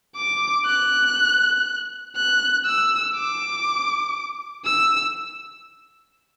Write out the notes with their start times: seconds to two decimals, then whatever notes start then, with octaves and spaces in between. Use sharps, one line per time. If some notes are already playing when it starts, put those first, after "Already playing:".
0.17 D6
0.66 F#6
2.16 F#6
2.65 E6
3.16 D6
4.65 E6